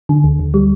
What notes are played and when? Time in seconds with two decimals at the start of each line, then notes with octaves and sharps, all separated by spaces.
0.09 D3
0.24 D2
0.39 D2
0.54 G3